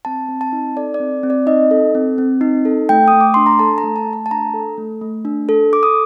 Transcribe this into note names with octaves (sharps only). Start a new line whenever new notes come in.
C4 A5
C4
A5
D#4
A4 D5
D5
C4
C4
D5
D#4 D#5
A4
C4
C4
D#4
A4
A3 G5
D#6
A3
D6
D4 C6
A#5
A4 A5
A#5
A3
A5
A3
A5
A5
D4 A#5
A4
A3
A3
D4
A4
A4 D6
D#6